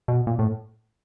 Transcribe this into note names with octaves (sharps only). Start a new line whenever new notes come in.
B2
A#2
A2